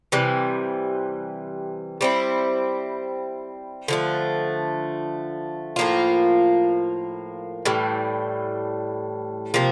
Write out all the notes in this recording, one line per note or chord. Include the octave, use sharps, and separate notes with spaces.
C3 E3 G3
G3 C4 E4
D3 F3 A3
A2 F3 A#3 F4
A2 E3 G3
C3 F3 A#3